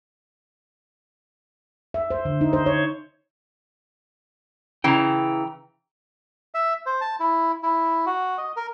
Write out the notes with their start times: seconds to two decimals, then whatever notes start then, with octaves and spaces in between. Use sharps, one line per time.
1.94 E5
2.10 C5
2.25 D3
2.41 D#4
2.53 C5
2.66 C#5
4.84 C#3 E3 G5 A#5
6.54 E5
6.86 C5
7.01 A5
7.20 E4
7.63 E4
8.06 F#4
8.38 D#5
8.56 A#4